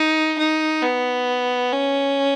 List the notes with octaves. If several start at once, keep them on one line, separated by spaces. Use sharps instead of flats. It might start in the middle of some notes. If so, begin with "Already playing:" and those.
Already playing: D#4
D#4
B3
C#4